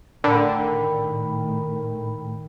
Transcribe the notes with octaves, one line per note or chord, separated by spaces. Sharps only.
A2 D3 D#3 A#4 G5 B5